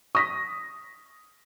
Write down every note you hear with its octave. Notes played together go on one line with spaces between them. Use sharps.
C#6 D#6 A#6 B6